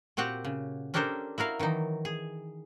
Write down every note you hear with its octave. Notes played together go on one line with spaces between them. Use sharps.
A#2 C4 F#4 G4 F#5
C#3
C#4 D4 G4 A4 A#4 C5
E4 F#4 A#4 F5
D#3 E3 F#3 D#4
G#4